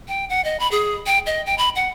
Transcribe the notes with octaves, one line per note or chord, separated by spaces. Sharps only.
G5
F#5
D#5
B5
G#4
G5
D#5
G5
B5
F#5